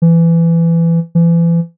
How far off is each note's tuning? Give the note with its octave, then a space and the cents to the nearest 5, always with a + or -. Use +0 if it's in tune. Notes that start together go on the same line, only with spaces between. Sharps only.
E3 +20
E3 +35